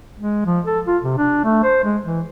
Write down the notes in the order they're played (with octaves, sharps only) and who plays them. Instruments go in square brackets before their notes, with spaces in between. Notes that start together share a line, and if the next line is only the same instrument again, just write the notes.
[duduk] G#3
F3
A4
F4
C3
D4
A3
C5
G#3
E3